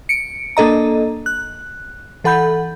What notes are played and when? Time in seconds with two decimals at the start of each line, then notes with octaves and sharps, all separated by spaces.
0.09 C#7 D7
0.57 A#3 D4 A4 D#5 A#5
1.26 F#6
2.24 E3 A4 F#5 B5 G6